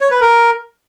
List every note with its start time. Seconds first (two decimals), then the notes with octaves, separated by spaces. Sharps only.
0.01 C#5
0.11 B4
0.21 A#4